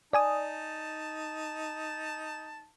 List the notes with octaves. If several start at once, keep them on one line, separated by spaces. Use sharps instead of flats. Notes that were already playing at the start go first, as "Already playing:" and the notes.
D#4 D5 G#5 A5 D#6